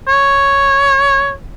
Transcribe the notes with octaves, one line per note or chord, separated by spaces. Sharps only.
C#5